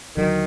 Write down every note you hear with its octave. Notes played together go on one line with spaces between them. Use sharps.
D#2 D3 D#3 F#3